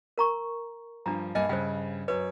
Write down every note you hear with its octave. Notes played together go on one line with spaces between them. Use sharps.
A#4 A#5 C#6
G2 F3 D4 A#5
G2 A#3 D#5 G#5
G2 C#3 C5 G5
F#2 B4 C#5